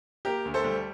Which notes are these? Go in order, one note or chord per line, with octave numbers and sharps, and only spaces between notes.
A#3 G4 A#4
D2
A4 C5
G3